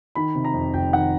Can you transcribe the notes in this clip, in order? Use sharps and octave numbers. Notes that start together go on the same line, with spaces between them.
D#3 B5
C3
A#5
F2
F1 G5
D#3 F#5